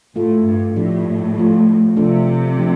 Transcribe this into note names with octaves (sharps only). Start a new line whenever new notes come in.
A2 A3 F4 A4
G2
A2 F3 D4 G4
F3 A3 F4
C3 F3 D4 F4 A4
F3 A3 D4